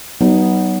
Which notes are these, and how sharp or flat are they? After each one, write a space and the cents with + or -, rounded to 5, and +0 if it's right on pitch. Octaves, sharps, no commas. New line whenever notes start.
F#3 +40 B3 +0 D#4 +0